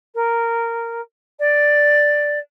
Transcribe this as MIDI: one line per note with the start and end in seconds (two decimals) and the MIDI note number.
0.15 1.01 70
1.39 2.39 74